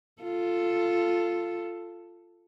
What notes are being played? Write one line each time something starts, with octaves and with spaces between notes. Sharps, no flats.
F4 A4